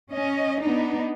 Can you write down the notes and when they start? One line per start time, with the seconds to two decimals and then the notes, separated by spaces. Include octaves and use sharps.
0.13 C#4 D#5
0.62 B3 D4 D#4